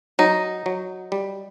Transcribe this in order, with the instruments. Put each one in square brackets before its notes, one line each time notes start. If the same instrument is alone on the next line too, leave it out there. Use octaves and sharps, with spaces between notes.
[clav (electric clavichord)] F#3 [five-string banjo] D#4
[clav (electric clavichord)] F#3
G3